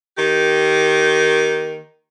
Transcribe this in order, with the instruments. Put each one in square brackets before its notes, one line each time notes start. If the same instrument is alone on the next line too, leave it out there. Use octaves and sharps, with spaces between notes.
[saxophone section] D#3 A#3 G4